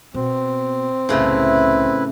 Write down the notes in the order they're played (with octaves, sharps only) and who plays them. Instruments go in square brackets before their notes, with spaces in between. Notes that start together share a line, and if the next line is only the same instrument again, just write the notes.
[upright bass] B2 [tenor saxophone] C4
[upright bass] F#1 C2 [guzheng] A2 C#3 A3 [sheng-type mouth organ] E4 B4